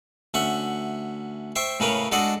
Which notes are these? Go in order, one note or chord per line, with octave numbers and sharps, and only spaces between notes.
D2 C#4 E5 F#5
C5 E5 G5 C#6
A2 C#3 C#4 A#4 B4 C#5
G#3 D4 F#4 A4 D#5 F#5